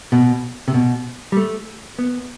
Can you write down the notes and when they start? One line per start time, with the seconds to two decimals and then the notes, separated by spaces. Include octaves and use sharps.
0.12 B2
0.68 C3
0.74 B2
1.32 G3
1.37 A3
1.99 B3